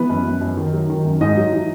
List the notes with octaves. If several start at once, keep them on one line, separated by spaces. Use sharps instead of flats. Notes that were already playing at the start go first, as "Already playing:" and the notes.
Already playing: E3 B3 B4
F#2
F#2
F#2
D#3
F#3
D#3
F#2
G#2 D#4 D#5
F#3
E3